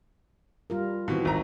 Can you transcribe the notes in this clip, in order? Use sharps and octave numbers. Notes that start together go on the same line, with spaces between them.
G3 F4 A#4
B2 D#3 E3 C4 F#4
G#1 A#5